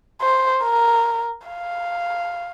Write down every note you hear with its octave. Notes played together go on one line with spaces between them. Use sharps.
C5
A#4
F5